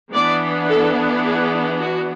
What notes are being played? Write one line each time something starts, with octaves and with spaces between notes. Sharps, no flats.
E3 B3 D4 D5
A4
G#4
F#4